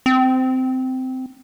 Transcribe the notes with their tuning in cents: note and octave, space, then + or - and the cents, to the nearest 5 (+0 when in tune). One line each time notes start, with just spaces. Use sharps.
C4 -15